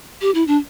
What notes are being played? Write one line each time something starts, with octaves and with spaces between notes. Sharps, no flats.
G4
E4
D4